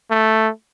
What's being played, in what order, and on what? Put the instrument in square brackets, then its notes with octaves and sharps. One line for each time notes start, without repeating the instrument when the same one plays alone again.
[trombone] A3